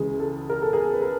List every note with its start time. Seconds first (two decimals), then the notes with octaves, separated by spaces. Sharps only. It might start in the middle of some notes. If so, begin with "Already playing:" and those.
Already playing: C#2 C#3 E3 G#4
0.20 A4
0.50 A#4
0.62 A4
0.73 G#4 A#4
0.93 B4
1.02 A#4